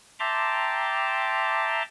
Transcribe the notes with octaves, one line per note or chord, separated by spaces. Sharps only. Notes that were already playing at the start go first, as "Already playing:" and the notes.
E5 G5 A5 A#5 C6 D6